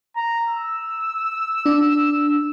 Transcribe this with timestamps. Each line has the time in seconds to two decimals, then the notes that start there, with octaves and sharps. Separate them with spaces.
0.16 A#5
0.48 E6
1.66 D4